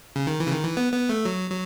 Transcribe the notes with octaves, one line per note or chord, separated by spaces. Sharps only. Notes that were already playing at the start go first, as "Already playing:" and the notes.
C#3
D#3
E3
C#3
D#3
E3
B3
B3
A3
F#3
F#3